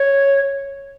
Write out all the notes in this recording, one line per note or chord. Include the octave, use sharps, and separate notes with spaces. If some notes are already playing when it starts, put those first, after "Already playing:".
Already playing: C#5